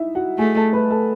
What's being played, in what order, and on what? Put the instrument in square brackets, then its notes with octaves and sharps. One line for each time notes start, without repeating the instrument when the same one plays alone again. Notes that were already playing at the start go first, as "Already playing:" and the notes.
Already playing: [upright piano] D#4 E4 E5
F#4 F#5
[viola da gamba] A3 [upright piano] G#4 G#5
[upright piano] A4 A5
B4 B5
A4 A5